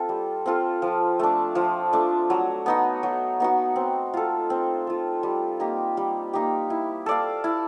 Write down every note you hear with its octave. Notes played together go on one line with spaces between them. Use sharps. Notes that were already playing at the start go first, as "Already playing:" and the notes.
Already playing: C4 F4 A4
G3
C4 F4 A4
F3
A3 D4
F3
A3 D4
F#3
B3 D#4 F#4
F#3
B3 D#4 F#4
C4
F4 A4
C4
F4 A4
G3
A#3 D#4 G4
G3
A#3 D#4 G4
E4
A4 D5 F5
E4